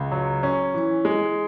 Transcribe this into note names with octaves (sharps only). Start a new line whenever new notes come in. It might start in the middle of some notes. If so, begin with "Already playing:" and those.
Already playing: C#2
F#3
C#4
E3
G#3